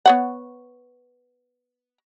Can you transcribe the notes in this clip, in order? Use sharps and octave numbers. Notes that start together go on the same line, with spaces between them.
B3 C#5 F#5